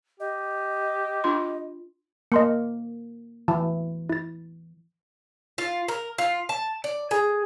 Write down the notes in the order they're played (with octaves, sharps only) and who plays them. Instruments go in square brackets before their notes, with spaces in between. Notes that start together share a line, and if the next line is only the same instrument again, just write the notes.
[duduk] G4 [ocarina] D#5
[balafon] D4 F4 C6
[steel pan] A#3 [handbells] D#5 C6 C#7
[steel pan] E3 [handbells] A5
[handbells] E4 A6
[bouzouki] F4
A#4
F4
A5
D5
G#4